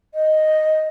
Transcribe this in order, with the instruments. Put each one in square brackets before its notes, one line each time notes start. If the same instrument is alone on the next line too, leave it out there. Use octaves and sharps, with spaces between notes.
[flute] D#5